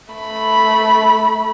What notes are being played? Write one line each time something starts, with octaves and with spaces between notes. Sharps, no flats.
A3 B5